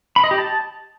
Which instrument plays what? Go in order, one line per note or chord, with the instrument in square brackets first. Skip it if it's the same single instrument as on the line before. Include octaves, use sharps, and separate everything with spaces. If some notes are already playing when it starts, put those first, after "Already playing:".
[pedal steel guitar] B5
D#5
G4
A5